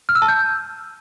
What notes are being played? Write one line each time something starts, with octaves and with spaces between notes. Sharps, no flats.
F6
E6
A5
G6